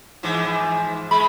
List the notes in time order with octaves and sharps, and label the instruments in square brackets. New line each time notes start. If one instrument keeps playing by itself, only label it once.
[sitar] G#2 E3 F3
[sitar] G#3 [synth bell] B5